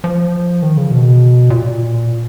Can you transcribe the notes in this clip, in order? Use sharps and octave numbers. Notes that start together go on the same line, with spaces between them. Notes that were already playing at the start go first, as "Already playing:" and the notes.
F3
D#3
C#3
B2
A#2